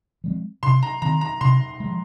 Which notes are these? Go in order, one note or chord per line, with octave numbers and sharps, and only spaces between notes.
F3 G#3 C4
C3 C6
A#5
D#3 C4 A#5
A#5
C3 C6
F3 G#3